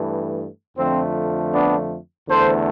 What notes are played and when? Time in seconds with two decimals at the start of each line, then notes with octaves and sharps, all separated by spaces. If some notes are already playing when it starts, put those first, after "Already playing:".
Already playing: G2 E3 A3
0.77 F2 D3 F3 A3 C4
1.53 B3 D4
2.28 E2 D3 A3 A4 C5